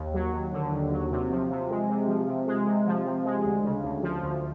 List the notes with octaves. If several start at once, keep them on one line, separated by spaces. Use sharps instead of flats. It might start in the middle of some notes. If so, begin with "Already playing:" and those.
Already playing: D#2
F#3
D#2
D3
D#2
F#3
C3
F3
C3
G#3
C3
F3
C3
G#3
C3
F3
C3
G#3
D2
C#3
D2
F3
D2